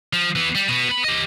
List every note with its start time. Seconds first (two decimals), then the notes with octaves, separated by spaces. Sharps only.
0.13 F3
0.36 E3 B3
0.55 G3
0.68 B2 B3
0.89 B3 B5
1.04 G4 D#5